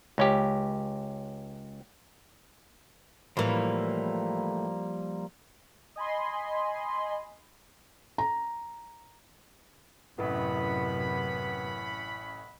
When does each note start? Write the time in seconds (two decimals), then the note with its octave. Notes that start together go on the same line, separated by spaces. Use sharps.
0.18 C#2 C#4 G4
3.37 A2 E3 F3 G3 A#3
5.96 D#5 G#5 B5 C6
8.18 A#5
10.18 A1 F#2 A2 C3 B3 C#4 F#5 B5